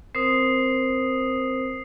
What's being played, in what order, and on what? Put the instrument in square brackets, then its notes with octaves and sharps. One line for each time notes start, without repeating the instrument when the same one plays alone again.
[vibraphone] C4 A#4 C5 [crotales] D#6 C7